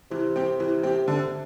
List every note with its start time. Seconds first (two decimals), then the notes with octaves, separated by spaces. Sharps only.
0.11 C3 E3
0.36 C4 G4
0.60 E3
0.83 C4 G4
1.08 D3